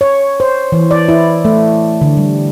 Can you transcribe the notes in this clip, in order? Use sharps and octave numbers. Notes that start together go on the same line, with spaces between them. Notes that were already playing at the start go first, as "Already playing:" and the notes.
C#5
C5
E3
D5
E4
A3
D3
G3